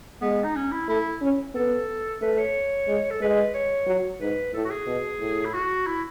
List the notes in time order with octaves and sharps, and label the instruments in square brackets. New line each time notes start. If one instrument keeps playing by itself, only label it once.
[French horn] G#3 [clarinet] B3
[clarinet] D#4
C#4
E4
[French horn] A3 [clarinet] E4
[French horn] C#4
[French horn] B3 [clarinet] A4
[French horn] A3 [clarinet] B4
[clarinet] C#5
[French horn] G#3
[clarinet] A4
[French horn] G#3 [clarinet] B4
[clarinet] C#5
[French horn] F#3
[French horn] G#2 [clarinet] B4
[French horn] A2 [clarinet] A4
[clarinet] F#4
G#4
[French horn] B2
A2
[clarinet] E4
F#4
E4